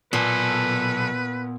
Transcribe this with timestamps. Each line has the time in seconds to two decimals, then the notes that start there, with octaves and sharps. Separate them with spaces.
0.13 B1 A#2 B3 A4 B4 G#5